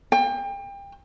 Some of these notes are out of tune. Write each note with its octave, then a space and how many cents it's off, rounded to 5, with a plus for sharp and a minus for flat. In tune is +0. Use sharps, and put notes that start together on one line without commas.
G5 +30